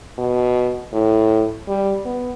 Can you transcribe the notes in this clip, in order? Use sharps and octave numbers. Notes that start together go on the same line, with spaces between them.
B2
A2
G3
B3